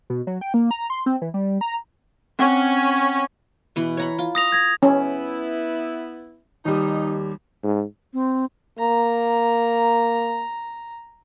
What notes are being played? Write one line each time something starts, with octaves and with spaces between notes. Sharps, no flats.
B2
F#3
G5
A#3
A#5
C6
C4
E3
G3
A#5
C4 C#4 F#5
B2 E3
C#5 A#5 B5
F4
D#6 A#6 F7
G#6 A#6
B3 C#4 E4
D#2 G3 D#4
G#2
C4
A#3 A#5